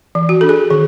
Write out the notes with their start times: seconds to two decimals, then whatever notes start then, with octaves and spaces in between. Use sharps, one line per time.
0.15 E3
0.29 F#4
0.41 D4 A4
0.49 G#4
0.70 D#3 G#4